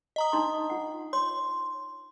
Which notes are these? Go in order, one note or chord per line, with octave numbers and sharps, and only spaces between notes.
D#5 A#5 D#6
D4 D#4 C6
F4 F#5
C#5 C6